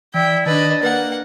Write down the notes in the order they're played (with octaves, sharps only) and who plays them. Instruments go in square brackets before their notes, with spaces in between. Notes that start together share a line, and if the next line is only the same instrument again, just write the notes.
[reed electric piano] E3 [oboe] E4 [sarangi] D5 [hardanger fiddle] G5
[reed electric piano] D#3 [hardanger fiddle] D4 B4 [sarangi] D#5 [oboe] A5
[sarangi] A#3 [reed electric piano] B4 [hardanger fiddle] F#5